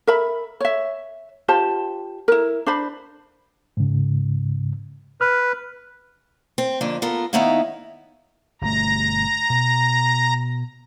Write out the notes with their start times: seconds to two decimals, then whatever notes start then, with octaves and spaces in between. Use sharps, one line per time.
0.07 A#4 E5 B5
0.60 C#5 E5
1.48 F4 G4 C5 A5
2.28 E4 A#4
2.66 D4 C5 B5
3.77 G#2 C#3
5.21 B4 F6
6.58 C4
6.81 F2 D3 A#3 D4
7.02 B3 F4 A4 A#4
7.33 D#3 B3 D#4 E4 C#5 F5
8.62 G1 B2 A3 A#5
9.50 B2